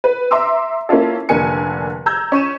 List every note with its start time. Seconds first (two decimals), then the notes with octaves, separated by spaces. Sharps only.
0.04 B4
0.31 E5 A#5 C6 D6 E6
0.89 A#3 C#4 E4 F4 A4
1.29 F1 D3 A#3 G#5 C#7
2.06 A#5 E6 G6 G#6
2.32 C#4 C#6 D#7 E7